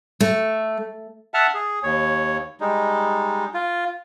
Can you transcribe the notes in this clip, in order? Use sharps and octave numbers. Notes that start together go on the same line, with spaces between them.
A3
E5 F#5 A5 F6
G#4
D#2 C#5
G3 G#3 D#4
F4